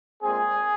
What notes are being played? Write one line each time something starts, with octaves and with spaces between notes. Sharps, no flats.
A#2 G#3 C4 G#4